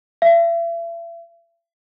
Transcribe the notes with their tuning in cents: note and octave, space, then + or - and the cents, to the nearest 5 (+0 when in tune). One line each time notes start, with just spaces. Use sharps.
E5 +40